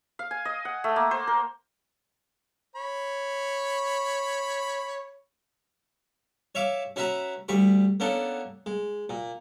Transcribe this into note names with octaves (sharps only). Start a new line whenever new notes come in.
F5
G#5
D#5
F#5
A3
A#3
C5
A#4
C#5 B5
C#5 E5 F5 D6
C#4 F#4 B4 E5 A#5
D2 G3 B5 C#6
A#3 B3 C#4 D4 A4
G#3
A#2